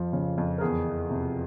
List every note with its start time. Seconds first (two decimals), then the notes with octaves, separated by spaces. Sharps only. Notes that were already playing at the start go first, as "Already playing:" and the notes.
Already playing: F2 F3
0.13 C#3
0.38 F2
0.58 A#4
0.61 E2 G#4
0.86 E3
1.11 C3